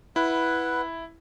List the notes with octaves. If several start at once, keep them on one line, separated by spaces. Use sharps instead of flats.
E4 B4 F#5